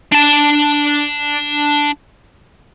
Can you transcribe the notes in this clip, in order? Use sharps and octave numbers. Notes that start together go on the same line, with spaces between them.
D4 A5